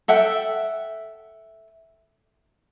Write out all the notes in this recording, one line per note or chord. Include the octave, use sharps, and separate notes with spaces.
A4 E5 F#5 G5